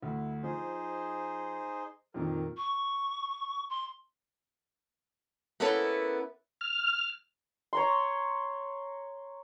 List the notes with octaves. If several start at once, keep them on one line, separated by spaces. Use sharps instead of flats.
D2 E4
F3 D#4 G#4 C5
F2 A#2 D#3 A#4
C#6
C6
A#3 B3 C#4 E4 A4 B4
F6
C#5 A#5 C6